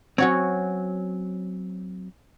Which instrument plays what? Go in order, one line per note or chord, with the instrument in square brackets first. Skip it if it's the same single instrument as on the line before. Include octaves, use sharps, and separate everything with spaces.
[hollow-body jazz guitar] F#3 C4 [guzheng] C#4 F#4 C#5